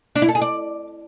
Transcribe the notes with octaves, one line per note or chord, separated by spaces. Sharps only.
D4
E4
A4
G#4
D5